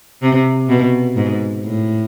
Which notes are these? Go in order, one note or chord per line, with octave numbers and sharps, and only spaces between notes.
C3
B2
G#2
A2